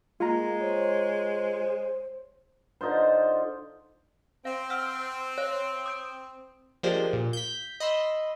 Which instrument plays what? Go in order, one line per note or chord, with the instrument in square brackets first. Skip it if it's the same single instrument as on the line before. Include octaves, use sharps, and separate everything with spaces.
[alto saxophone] G#3 [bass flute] A#3 [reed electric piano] F4 A#5
[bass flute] C5 [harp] C#5
[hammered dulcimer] D3 D#4 F4 C5
[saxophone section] C4 [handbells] F5
[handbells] F#5 E6 F6
C#5 F5
D#6 G6 D7
[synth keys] F3 G#3 A#3 D4 G4 C5
A#2
G6 B6
D#5 B5 C6 E6